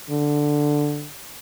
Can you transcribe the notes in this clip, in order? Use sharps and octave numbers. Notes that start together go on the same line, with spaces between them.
D3